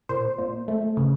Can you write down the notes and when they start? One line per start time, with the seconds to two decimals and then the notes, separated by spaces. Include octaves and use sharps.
0.09 A#2 C5
0.38 A#2
0.68 A3
0.97 C#3